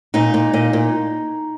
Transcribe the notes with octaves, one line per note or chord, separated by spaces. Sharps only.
A#2 D#4
A#2
A#2
A#2